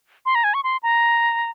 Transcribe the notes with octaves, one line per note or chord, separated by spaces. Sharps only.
C6
A#5
G#5
C#6
C6
A#5